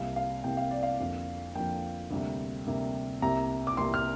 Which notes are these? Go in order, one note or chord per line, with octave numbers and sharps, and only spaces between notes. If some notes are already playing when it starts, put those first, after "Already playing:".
Already playing: C2 C3 G3 A#3 F5
F5
C2 C3 G3 A#3 G5
F5
D5
F5
F2 D3 F3 A#3
F2 D3 F3 A#3 G5
D2 C3 G3 A#3
D2 C3 G3 A#3
C2 C3 A#3 A#5
D6
C2 C3 A#3 C6
F6